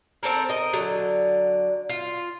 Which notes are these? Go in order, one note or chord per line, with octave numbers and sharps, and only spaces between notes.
C4 A4 A#4
A#4 D#5
D3 F#3
F4